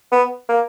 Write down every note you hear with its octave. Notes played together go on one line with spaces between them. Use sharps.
B3
A#3